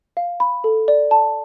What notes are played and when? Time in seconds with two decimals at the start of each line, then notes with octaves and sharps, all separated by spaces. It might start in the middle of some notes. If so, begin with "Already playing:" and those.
0.17 F5
0.40 B5
0.64 A4
0.88 D5
1.11 A5